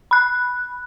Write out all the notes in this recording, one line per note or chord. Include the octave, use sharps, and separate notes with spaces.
B5 F#6